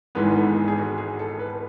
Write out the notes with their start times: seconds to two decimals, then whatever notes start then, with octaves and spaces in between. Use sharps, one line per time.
0.15 G#1 G#2 E3 G#3 B3 B4
0.36 A4
0.56 G#4
0.68 G#4
0.78 F#4
0.98 G#4
1.19 A4
1.39 B4